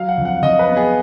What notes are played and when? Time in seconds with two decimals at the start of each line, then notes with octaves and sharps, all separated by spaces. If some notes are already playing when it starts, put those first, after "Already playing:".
Already playing: F#3 F5
0.09 F#5
0.18 F2
0.25 F#5
0.42 F2 D#5
0.59 B4
0.68 B3
0.77 G#4